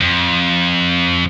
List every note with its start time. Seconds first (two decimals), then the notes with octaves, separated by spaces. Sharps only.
0.01 F2